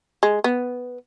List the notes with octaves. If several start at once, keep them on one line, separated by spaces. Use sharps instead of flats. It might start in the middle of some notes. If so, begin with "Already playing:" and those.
G#3
B3